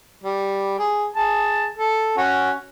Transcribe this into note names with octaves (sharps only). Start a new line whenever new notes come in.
G3
G#4
G#4 A5
A4
C#4 F#4